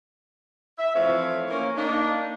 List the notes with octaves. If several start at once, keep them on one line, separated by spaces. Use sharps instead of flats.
E5
E3 F3 A3 C4 C#5 F5
A#3 C#4 A#4
A#3 D4 D#4